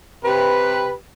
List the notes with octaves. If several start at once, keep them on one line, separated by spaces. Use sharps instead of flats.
C3 G4 B4